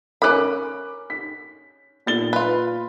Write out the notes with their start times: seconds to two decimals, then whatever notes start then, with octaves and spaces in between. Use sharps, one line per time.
0.22 C#4 A#4 B5 D6 F#6
1.10 B6
2.06 A#2 A6 G7
2.33 F4 B4